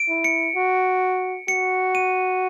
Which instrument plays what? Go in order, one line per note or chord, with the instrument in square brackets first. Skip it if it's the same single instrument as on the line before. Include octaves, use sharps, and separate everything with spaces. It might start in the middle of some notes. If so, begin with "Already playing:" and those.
Already playing: [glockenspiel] D7
[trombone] E4
[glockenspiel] C#7
[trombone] F#4
[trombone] F#4 [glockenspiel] C#7
[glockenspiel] D#7